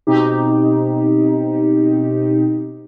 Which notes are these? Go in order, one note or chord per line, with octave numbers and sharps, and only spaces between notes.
B2 C4 D#4 G4